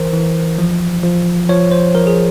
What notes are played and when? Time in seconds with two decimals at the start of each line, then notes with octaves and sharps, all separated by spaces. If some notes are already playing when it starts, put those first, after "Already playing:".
Already playing: E3 A#4 C5
0.13 E3
0.59 F3
1.03 F3
1.49 F3 C#5
1.72 C5
1.95 F3 A#4
2.07 G#4